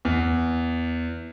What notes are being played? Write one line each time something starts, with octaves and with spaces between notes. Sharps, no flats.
E2